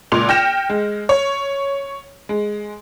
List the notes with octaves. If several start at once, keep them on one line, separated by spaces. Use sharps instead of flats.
C#2 A#2 C6 F7
G5 F6 G6 A#6 C#7 E7
G#3
C#5
G#3